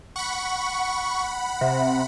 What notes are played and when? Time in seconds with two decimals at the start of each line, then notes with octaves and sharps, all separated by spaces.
0.16 F#5 B5 C#6
1.61 C3